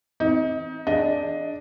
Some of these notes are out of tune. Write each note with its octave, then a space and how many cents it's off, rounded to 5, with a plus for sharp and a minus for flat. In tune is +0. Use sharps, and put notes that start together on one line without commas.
C4 +0 D#4 +25
D4 +0 G#4 +0 D#5 +10